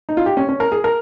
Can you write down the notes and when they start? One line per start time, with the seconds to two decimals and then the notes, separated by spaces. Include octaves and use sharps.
0.09 D#4
0.17 F4
0.26 G4
0.37 C#4
0.49 C#4
0.60 A#4
0.72 G#4
0.84 A#4